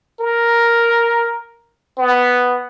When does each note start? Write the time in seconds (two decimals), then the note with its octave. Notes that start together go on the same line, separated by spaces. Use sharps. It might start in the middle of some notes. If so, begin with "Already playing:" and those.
0.20 A#4
1.98 B3